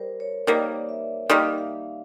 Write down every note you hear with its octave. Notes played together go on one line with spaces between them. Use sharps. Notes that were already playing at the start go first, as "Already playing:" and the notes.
Already playing: G3 A#4 C5
C#5
D#3 G3 A#3 D5
E5
D#3 G3 A#3
F5
E5
F5